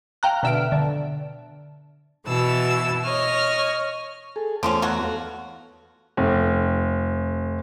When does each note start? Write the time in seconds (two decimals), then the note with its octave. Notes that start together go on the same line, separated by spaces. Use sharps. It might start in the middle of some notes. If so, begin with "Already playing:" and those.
0.23 F5 G5 A#5 F#6
0.43 B2 D3 E5 F6 D7
0.72 D3
2.26 B2 E3 A5 E6
3.05 C#5 D#5 F6
4.36 G#4 A4
4.63 E2 D3 F3 A3 B3 C#4
4.82 B2 F#3 F#4
5.04 A4 F5
6.17 F1